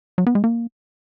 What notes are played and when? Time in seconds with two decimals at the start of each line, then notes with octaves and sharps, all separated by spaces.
0.18 F#3
0.27 B3
0.35 G#3
0.44 A#3